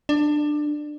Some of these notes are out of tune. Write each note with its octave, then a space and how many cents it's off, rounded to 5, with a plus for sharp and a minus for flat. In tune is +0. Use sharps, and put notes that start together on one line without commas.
D4 +20